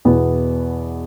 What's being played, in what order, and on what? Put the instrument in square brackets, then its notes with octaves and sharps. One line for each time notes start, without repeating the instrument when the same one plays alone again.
[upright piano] E2 B2 B3